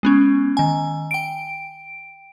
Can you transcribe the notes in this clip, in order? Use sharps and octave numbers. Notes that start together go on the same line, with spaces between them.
G#3 B3 C#4
D#3 G#5
G5 D7